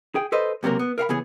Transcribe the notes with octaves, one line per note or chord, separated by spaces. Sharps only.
G#4 G5
A4 B4 C5 D#5
C#2 C3 F#3 A#3 A#4
B3
A#4 F5 F#5 B5
C#3 E3 B3 G#4